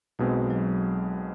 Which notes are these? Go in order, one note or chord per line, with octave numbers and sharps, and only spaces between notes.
B1 B2 F#3 G#3 C4
F#3